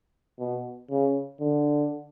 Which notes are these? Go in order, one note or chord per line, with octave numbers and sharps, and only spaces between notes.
B2
C#3
D3